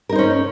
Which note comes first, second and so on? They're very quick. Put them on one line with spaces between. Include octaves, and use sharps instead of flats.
A#4 D#4 C5 C#4